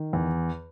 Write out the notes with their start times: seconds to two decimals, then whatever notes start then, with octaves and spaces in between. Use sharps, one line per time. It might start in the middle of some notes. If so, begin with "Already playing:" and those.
Already playing: D#3
0.13 E2